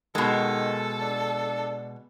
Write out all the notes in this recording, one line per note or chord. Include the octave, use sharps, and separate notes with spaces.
B2 D#3 G#3 A4
D4